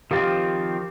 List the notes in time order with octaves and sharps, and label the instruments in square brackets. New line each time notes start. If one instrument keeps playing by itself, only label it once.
[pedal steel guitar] D#3 F3 C4 [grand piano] G4 F5 A6